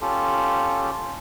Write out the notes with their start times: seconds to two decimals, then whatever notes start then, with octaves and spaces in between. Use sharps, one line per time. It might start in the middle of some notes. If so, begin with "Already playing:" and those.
0.01 C#4 F4 G4 A4